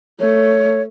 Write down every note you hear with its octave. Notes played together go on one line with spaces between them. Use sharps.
A3 C#5